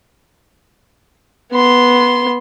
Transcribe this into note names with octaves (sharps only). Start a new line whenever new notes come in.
B3 C6